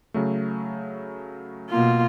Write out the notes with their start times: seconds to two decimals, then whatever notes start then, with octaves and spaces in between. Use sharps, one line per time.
0.14 C#3 F#3 A3
1.69 B2 A#3 F4